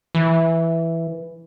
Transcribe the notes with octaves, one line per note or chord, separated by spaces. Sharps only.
E3